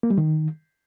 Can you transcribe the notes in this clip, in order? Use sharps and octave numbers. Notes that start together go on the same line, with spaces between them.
A#3
G3
D#3